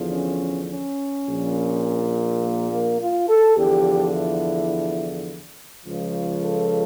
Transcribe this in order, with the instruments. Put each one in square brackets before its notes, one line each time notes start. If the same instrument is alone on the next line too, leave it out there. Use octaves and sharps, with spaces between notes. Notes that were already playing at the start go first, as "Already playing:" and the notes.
Already playing: [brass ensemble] E2 D3 F3
C#4
C#4
A#1 A#2 F3
A#3
A#3
F4
A4
E2 D3 F3 G4
E4
C#2 C#3 F3
A4